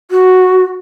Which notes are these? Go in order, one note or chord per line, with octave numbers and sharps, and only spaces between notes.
F#4